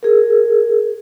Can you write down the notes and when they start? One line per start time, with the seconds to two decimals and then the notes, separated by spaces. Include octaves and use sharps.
0.03 G#4 A#4